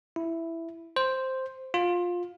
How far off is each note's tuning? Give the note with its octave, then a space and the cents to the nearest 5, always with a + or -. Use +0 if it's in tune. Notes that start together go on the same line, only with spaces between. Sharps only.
E4 +5
C5 +0
F4 +15